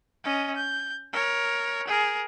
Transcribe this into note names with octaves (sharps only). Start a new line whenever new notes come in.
C#4 D#5
G6
A#4 C#5
G#4 A#4